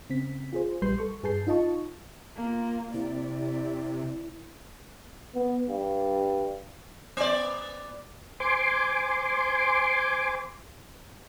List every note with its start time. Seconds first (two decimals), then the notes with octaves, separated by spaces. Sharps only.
0.10 C#3 C4 B6
0.53 F4 G#4 C5
0.82 A#1 G3 B4 C6 G6 C7
0.99 A4 C#6
1.23 G2 G#4 B4 A5 G6 C7
1.47 D#4 F4 D#5 A5 C#6
2.36 A#3 F4
2.94 C3 E4 D5
5.35 B3
5.69 G2
7.17 B3 D5
8.40 C5 G#5 C6 D6